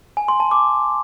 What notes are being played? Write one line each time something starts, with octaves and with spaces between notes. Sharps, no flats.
G#5
C6
A5
D6